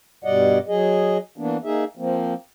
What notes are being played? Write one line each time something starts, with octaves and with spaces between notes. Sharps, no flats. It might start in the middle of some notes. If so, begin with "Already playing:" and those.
G2 B2 G3 D5 D#5 F#5
F#3 G#4 D#5
E3 A#3 B3 D4
A#3 D#4 G#4 E5
F3 A#3 C4